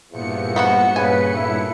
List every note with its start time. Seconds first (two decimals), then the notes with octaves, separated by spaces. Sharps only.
0.13 E2 G2 A#2 F3 C#7
0.56 B3 F#4 F#5
0.96 C#3 B4 G#5
1.35 B1 A2 E4